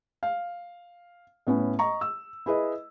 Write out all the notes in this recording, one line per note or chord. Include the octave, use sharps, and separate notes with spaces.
F5
A2 B3 C#4
D#5 A#5 C#6
E6
E4 G#4 B4 D#5